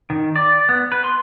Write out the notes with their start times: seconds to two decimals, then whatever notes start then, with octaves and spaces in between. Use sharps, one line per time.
0.10 D#3
0.36 D5
0.69 B3
0.92 B4
1.04 C6